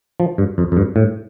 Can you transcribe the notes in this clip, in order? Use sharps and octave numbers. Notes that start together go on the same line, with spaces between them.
F3
G2
F2
F2
G2
A2